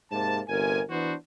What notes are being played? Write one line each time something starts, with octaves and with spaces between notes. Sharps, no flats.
G#2 C3 A#3 A5
G1 C3 A#4 G#5
E3 B3 D4 F#4 C5